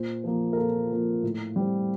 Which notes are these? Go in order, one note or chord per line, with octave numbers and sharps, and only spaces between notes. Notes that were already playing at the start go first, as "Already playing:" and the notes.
Already playing: A#2 C5
F3 A#3
A#4
A#2 F4 A4
F3 A#3
A2
G3 C4